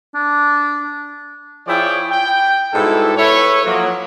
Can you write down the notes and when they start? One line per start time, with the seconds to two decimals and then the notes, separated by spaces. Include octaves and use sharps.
0.15 D4
1.67 F3 E4 G#4 C#5 D5 G5
2.10 G5
2.73 G#2 B2 G3 E4 A4
3.17 E4 A4 B4 C#5
3.65 F3 F#3 A#3